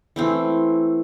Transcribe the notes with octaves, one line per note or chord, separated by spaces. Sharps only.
E3 A3 C4